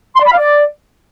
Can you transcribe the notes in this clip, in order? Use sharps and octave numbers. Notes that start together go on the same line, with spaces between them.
C6
D5
B5
F5
D5